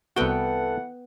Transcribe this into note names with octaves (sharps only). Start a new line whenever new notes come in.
C2 E3 B3 F#4 A4 F#5 G5